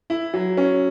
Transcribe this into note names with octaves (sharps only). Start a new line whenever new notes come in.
E4
F#3
C#4